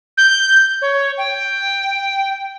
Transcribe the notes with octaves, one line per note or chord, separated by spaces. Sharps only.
G6
C#5
G5